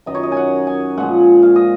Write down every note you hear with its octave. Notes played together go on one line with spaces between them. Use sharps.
F#2 D#3 F#3 D#5
C#5
D#5
F#5 G#5
G#5
A#2 F3 G#3 F#5
F5
D#5